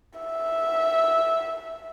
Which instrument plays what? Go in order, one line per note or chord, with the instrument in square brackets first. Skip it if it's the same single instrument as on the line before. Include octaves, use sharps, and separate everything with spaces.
[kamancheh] E5